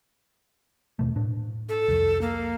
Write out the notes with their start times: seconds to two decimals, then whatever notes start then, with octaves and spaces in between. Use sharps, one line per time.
0.99 D#2 B2 A3
1.16 A2 D4
1.69 A4
1.88 C2 F2
2.21 A#3